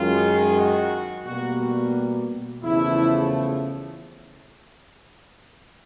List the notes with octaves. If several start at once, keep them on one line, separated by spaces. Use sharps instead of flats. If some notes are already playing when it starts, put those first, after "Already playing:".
Already playing: F#2 D#3 G#3 F4
F#4
B2 G3 A#3 F#4
E2 C#3 F3 A3 E4